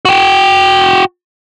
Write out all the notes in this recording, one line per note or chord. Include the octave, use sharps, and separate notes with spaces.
F#4 G5